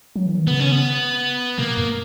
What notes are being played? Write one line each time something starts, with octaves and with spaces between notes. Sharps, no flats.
F#3
E3
D#3
C#3 B3
C#4
B3
B2 A#3
F#2